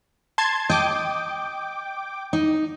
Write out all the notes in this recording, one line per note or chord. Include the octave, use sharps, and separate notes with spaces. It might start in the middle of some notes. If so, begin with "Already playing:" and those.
A5 C6 G#6
D#5 G5 D6
D#4